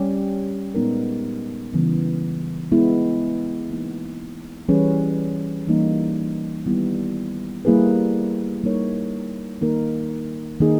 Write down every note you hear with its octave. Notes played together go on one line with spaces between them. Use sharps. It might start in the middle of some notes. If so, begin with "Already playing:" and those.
Already playing: G3 C#4 G4
A#2 G#3 B3 D#4 A#4
C#3 E3 G3 B3
G#3 B3 E4
E3 A#3 D#4
E3 G3 C#4 G#4 B4
E3 G3 A#3 D#4
D#3 G3 B3 E4
G3 A#3 E4 G#4 B4
G3 A#3 D#4 A#4 C#5
D#3 A#3 D#4 A#4
D#3 A#3 D#4 G#4